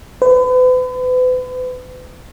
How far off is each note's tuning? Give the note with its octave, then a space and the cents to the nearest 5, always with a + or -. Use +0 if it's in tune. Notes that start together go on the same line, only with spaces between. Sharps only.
B4 +40